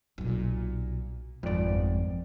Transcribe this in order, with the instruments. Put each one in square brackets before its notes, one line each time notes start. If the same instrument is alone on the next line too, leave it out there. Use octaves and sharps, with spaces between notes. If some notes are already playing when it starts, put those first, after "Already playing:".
[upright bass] B1 A#2
[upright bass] G1 G#2 [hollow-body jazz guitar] F2 D5